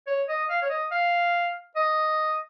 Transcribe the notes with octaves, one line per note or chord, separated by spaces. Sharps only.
C#5
D#5
F5
C#5
D#5
F5
D#5